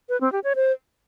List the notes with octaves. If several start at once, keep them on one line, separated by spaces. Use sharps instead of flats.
B4
C4
G4
C#5
C5